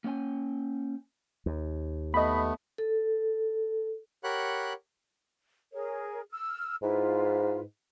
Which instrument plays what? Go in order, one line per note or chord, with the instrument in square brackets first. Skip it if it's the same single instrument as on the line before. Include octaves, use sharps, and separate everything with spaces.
[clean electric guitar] A#3 C#4 C#5 G5 G#5
[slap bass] D#2
[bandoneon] A3 B3 [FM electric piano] D#5 B5
[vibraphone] A4
[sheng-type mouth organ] G4 A#4 C#5 F#5 B5 F#6
[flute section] G#4 A#4 C#5
E6 F6
[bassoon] G#2 [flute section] E4 F4 B4